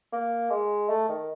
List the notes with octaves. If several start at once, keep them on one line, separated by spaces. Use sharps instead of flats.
A#3
G#3
A3
D#3